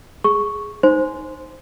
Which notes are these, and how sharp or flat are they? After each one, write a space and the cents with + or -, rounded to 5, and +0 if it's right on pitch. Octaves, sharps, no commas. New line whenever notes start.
G#4 +0 C#6 +0
D#4 +0 C5 +0 C6 -10